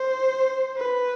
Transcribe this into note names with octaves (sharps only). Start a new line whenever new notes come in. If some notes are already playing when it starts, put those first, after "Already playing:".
Already playing: C5
B4